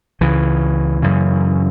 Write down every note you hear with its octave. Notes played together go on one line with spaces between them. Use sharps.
C#2 C#3 E3
F#2 C#3